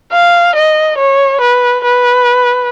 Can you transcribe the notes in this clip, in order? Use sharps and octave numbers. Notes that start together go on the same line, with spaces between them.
F5
D#5
C#5
B4
B4